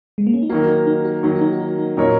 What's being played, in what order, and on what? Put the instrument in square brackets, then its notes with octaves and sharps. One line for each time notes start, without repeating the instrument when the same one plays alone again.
[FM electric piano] G#3
A#3
C#4
D#4
[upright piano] D#3 F#3 A#3 [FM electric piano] F#4
[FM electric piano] D#4
D#4
F#4
[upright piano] D#3 F#3 A#3 [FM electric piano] D#4
[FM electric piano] F#4
D#4
F#4
D#4
D#4
[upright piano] A#2 F#3 D#4 A#4 C#5 [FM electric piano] C#4